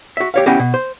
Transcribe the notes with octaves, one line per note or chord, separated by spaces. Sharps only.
F#4 E5
G4 C#5 F5
B3 C#4 E4 G4 D#5 G#5
B2
C5